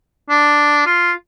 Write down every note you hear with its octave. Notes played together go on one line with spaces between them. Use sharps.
D4
F4